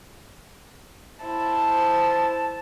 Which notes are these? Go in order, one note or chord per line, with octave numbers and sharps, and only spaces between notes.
E4 C5 A5